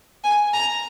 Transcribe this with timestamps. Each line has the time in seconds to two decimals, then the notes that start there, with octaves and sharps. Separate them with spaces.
0.24 G#5
0.53 A#5